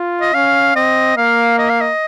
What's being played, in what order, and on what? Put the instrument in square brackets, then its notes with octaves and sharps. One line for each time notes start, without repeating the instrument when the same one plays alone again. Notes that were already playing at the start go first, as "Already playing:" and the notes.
Already playing: [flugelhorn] F4
[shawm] D#5
[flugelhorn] C#4 [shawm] F5
[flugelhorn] C4 [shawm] D#5
[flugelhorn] A#3 [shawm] F5
[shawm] D#5
F5
D#5